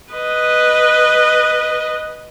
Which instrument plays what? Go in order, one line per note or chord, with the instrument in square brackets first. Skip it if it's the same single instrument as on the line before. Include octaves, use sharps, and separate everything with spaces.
[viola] B4 D#5